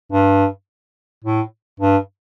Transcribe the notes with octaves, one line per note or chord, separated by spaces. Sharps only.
G2
A2
G2